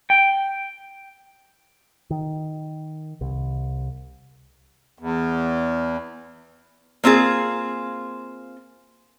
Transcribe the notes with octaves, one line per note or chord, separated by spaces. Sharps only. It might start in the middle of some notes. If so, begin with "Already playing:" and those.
G5
D#3
C2
E2
A#3 C4 F4 G#4